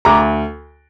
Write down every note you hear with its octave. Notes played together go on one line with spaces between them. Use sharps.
D2 A#5 D6